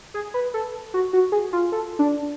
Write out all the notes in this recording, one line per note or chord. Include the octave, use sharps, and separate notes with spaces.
G#4
B4
A4
F#4
F#4
G#4
F4
A4
D4